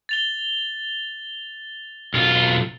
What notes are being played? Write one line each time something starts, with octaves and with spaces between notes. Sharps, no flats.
A6 F7 G7
B1 F4